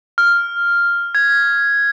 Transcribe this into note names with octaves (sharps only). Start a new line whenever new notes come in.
F6
G#6